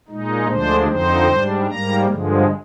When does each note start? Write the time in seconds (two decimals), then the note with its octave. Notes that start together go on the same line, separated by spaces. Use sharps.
0.08 A#2 G#3 D#4
0.48 D2 D3 F3 G#3 D4 C5
0.88 F2 D3 F3 C4 D#4 C5
1.27 G#2 G3 D4
1.67 G#2 G3 A#3 A#5
2.07 G2 D3 F3 G#3